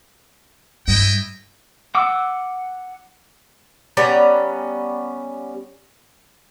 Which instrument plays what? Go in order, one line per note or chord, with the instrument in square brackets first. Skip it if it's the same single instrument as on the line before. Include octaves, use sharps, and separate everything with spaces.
[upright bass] G2 [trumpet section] E4 D#5 G5
[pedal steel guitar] F#5 D6 E6
[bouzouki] G3 B3 C#4 A#5